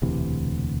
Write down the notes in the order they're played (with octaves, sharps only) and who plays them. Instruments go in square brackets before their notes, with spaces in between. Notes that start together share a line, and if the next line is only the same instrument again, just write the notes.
[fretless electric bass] E1 D2 C3 E3